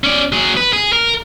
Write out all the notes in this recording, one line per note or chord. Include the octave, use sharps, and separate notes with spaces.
C#4 D5
F#3 G#4
B4
G#4
A#4